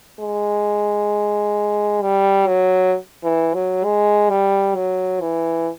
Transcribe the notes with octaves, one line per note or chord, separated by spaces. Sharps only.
G#3
G3
F#3
E3
F#3
G#3
G3
F#3
E3